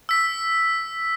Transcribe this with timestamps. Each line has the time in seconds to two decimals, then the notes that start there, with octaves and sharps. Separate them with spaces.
0.09 E6 B6